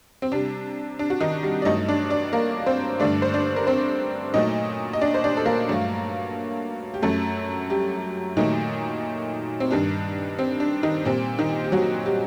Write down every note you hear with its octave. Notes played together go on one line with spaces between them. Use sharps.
C4
C3 G3 D4
D4
F#4
D#3 D#4
G3 G4
D5
G2 F#3 A3 D#4 D#5
D4 D5
D4 D5
A#3 A#4
C4 C5
G2 D3 A3 D4 D5
C5
D4 D5
A#4
C4 C5
A#2 F#3 A3 D#4 D#5
D#5
D4 D5
C5
D4 D5
A4
A#3 A#4
G2 F#3 A3
G4
F#2 F#3 A3 A4
G3 G4
A#2 D#3 F#3 A3 D#4
C4
G2 D#3 G3 D4
C4
D4
D#3 D#4
A#2 G3 C4
D#3 D#4
G4
F#3 F#4
G3 G4